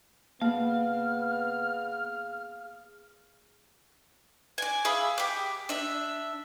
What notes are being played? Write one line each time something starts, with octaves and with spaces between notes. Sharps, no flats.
A#3 B3 G#4 F5 F6
D5 G#5
G#4 E5 F5 B5
G4 D6
D4 E5